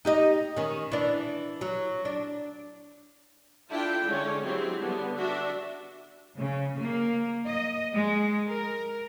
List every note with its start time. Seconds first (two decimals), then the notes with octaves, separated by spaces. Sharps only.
0.05 D#4 G4 D#5
0.57 D#3 C#4
0.92 E3 D4
1.61 F#3
2.05 D4
3.70 D4 E4 F4 A4 G5
4.05 D3 G#3 C#4 C#5
4.42 F#3 G#3 C4 E4 F#4 G4
4.79 D3 G3 B3
5.17 D4 F#4 E5
6.36 C#3
6.77 A#3
7.46 D#5
7.94 G#3
8.49 A#4